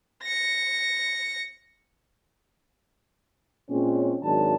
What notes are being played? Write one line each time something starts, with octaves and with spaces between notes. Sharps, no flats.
A#6 C#7
A#2 G#3 C4 C#4
G#1 D#3 F#3 G#3 D4 A5